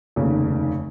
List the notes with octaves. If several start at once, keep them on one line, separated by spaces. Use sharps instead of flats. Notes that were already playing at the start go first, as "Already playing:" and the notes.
F1 D#2 C#3